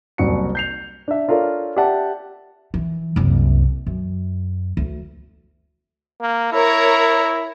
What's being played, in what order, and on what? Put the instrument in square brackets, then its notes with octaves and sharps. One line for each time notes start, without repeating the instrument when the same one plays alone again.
[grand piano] F#1 C2 F#4 C#7
G6 C7 F7
D4 E5
D4 F4 A4 A#4 C#5 D5
G4 D5 E5 F#5 A5
[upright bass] E3
F#1 C2
F#2
D2
[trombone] A#3
[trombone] E4 [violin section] A#4 C#5 A#5